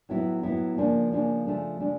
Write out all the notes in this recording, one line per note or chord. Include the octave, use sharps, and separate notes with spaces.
A2 F#3 B3 E4
A2 F#3 B3 E4
C#3 F3 A#3 D4
C#3 F3 A#3 D4
C#3 F3 A3 D4
C#3 F3 A3 D4